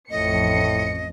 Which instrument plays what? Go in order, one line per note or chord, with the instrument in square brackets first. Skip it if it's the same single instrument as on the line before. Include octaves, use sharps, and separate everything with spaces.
[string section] A1 F2 C#7 [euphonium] A2 [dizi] D#5